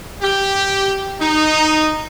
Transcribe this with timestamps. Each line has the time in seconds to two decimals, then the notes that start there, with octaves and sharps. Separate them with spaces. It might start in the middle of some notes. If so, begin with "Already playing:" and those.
0.22 G4
1.19 D#4